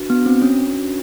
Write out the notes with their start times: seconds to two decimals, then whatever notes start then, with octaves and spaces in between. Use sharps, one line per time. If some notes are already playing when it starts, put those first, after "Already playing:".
Already playing: D4 F#4 B4
0.10 B3
0.26 C4
0.42 C#4